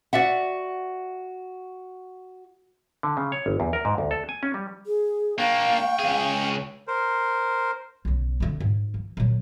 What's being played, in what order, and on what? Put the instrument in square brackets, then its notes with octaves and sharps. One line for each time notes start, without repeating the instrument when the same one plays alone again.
[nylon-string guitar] F#4 D5 E5 F#5
[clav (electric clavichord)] D3
C#3
C#5
G1
E2
A#4
G#2
D2
A4
G#5
C#4
G3
[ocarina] G#4
[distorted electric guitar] A#3 D4 [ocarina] F5 [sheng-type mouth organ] G5 C#6
[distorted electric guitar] C#2 G#4
[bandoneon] A#4 C5
[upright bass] B1 C#3
D3 C4
G#2
E3
A#2 F#3